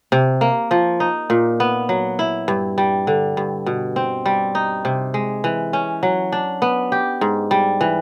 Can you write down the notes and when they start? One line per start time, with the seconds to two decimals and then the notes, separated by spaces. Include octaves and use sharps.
0.12 C3
0.41 A#3
0.71 F3
1.00 D#4
1.30 A#2
1.60 B3
1.89 F#3
2.19 E4
2.48 G2
2.78 G3
3.07 D3
3.37 G2
3.66 B2
3.96 C4
4.26 G3
4.55 D#4
4.85 C3
5.14 G#3
5.44 E3
5.73 C#4
6.03 F#3
6.32 D4
6.62 B3
6.92 G4
7.21 G#2
7.51 G3
7.81 E3